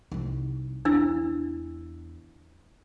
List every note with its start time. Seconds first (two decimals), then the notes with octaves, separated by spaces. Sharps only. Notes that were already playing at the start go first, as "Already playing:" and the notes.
0.12 C2 D#4
0.85 E2 D4 E4 E6